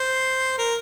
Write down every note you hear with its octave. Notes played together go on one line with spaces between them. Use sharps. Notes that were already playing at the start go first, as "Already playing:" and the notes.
Already playing: C5
A#4